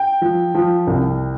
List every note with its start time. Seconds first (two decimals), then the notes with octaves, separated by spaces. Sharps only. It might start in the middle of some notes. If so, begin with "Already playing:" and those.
Already playing: G5
0.21 F3
0.55 F3
0.87 C2